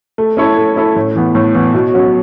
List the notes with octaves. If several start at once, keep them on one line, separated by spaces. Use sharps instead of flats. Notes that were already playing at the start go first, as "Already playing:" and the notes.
A3
C#4 E4 A4 C#5
A3
C#4 E4 A4 C#5
A2
E3 B3
A2
E3 B3
B2
F#3 C#4